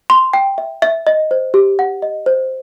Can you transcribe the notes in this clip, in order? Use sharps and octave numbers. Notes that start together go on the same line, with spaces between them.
C6
G5
E5
E5
D#5
C5
G4
F#5
D#5
C5